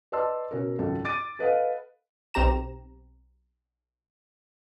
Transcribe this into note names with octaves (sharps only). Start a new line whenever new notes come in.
B4 D5 D#5 A5 C6 E6
B2 C#4 A#4
G#1 C#2 F#2 A4
D6 A6 D7 D#7
A4 B4 D#5 F5 F#5
B1 C4 G4 A#5 E7